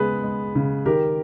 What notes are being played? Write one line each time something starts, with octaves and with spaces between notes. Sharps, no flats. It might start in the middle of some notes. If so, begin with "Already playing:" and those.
Already playing: C#3 G#3 B3 G#4 B4
G#3
C#3
D#3 G4 A#4